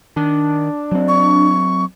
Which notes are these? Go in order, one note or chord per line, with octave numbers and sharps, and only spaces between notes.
D#3 D4
F#3 C4
C#6